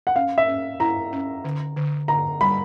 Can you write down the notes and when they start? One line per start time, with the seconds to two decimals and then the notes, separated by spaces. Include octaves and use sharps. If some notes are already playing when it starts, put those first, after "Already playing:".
0.07 F#5
0.15 C#4 F5
0.38 E5
0.48 C#4
0.80 E4 A#5
1.13 C#4
1.45 D3
1.76 D3
2.08 D3 A#5
2.41 G3 B5